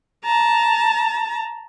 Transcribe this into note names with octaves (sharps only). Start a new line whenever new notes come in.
A5 A#5